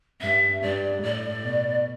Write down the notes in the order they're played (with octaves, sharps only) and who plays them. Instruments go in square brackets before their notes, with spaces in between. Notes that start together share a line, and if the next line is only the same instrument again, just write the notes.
[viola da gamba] G2 [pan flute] E5
[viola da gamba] G2 [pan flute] D5
[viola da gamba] A2 [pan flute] D5
[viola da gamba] B2